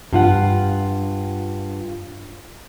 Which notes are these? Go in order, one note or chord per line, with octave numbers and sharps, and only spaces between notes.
G2 F4 F#5